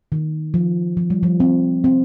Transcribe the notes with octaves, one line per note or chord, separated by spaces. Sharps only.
D#3
F3
F3
G3
F3
C4
C4